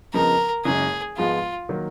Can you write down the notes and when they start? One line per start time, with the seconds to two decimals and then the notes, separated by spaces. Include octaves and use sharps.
0.14 F2 C#3 F3 B3 D#4 A#4
0.65 F#1 F#2 C#3 G#3 D#4 G#4
1.17 G#2 F3 G#3 B3 F4
1.69 D#3 F#3 A#3